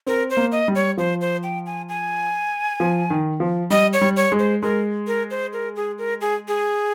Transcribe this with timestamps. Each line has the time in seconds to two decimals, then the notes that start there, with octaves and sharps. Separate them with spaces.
0.06 C4 A#4
0.30 C5
0.37 A#3
0.52 D#5
0.68 G3
0.75 C#5
0.97 F3 C5
1.21 C5
1.43 G5
1.66 G#5
1.89 G#5
2.80 F3
3.10 D#3
3.40 F3
3.70 G3 D#5
3.93 C#5
4.01 G3
4.17 C#5
4.32 G#3
4.39 C5
4.63 G#3 A#4
5.07 A#4
5.31 C5
5.53 A#4
5.76 G#4
5.98 A#4
6.21 G#4
6.48 G#4